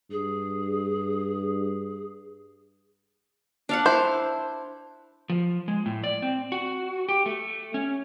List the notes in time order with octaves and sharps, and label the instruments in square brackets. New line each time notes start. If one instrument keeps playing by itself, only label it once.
[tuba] G2 [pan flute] G#4
[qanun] D4 F5 F#5
[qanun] E4 [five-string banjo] C5
[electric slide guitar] F3
G#3
A2
D5
C4
F#4
G4
A3
C#4